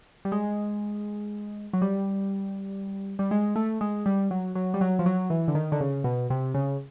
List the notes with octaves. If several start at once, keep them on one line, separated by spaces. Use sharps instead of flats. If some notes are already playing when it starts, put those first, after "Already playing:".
G3
G#3
F#3
G3
G3
G#3
A3
G#3
G3
F#3
F#3
G3
F#3
F3
F#3
E3
D3
D#3
D3
C#3
B2
C3
C#3